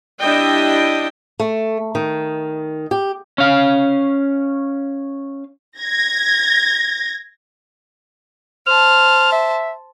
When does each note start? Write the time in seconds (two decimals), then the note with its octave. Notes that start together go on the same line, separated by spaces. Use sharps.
0.21 G3 D4 E4 D#5 G5
1.40 A3
1.95 D#3
2.91 G4
3.38 C#4 F5
5.79 G#6 A#6
8.67 C5 A5 F6
9.32 E5